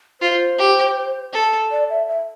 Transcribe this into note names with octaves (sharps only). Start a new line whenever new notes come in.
F4 C5
G4
A4
D5
E5
E5